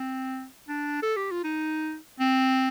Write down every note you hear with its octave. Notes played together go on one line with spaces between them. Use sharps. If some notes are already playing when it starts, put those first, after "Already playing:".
Already playing: C4
D4
A4
G4
F4
D#4
C4